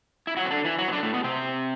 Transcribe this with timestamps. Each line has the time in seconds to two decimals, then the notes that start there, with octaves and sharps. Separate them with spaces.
0.27 E4
0.37 F#3 F#4
0.45 C4
0.50 D3 D4
0.65 E3 E4
0.79 F#3 F#4
0.88 C4
0.92 D3 D4
1.03 A2 A3
1.13 B2 B3
1.24 C3 C4